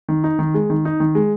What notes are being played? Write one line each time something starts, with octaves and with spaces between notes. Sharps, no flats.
D#3
D#4
D#3
G#3
D#3
D#4
D#3
G#3